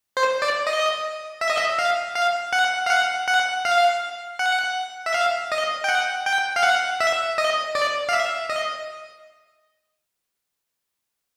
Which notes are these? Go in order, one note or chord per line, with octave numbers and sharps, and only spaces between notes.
C5
D5
D#5
E5
D#5
E5
F5
F5
F#5
F5
F#5
F#5
F5
F#5
E5
F5
D#5
G5
F#5
G5
F5
F#5
E5
D#5
D5
F5
E5
D#5